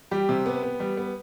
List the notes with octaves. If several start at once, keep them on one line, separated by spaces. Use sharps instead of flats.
G3 G4
C3
B3
B3
G3
B3